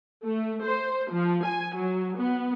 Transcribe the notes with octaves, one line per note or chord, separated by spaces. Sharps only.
A3
C5
F3
G#5
F#3
B3